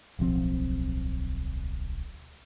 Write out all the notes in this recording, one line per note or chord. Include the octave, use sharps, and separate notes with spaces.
D1 B1 F3 C4